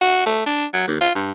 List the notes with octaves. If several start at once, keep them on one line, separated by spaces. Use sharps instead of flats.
F#4
A3
D4
F#3
D#2
F4
G2